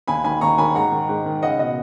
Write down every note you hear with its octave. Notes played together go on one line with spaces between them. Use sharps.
D#2 G#5 B5
D#3 G#5 B5
D#2 A#5 C#6
D#3 G#5 B5
G#2 F#5 A#5
D#3
G#2
D#3
C#2 D#5 F#5
B2 D#5 F#5